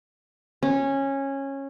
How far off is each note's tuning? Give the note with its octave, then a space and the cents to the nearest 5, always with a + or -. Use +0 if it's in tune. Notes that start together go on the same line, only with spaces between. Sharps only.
C#4 -15